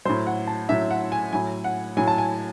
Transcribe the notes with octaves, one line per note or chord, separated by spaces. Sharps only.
A2 F#3 C5
F#5
A5
A2 F#3 E5
F#5
G#5
A2 F#3 G#5
F#5
A2 F#3 G#5
A5
G#5